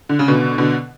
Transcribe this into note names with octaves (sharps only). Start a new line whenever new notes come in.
D3
C#3
B2 D3
B2 D3